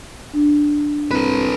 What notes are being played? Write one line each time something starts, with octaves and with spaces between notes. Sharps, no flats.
D4
C2 A4 B4